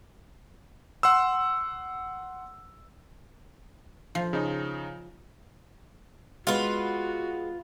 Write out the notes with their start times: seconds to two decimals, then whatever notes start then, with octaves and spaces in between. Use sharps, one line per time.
1.03 F#5 C6 E6
4.15 F3
4.33 C#3 D#4
6.47 G#3 B3 F4 F#4 B4